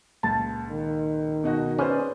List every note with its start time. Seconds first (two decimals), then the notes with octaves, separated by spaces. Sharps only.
0.23 C#2 A#2 A5
0.70 D#3
1.44 B2 D#4 F#4
1.79 C#4 G#4 B4 C5 D5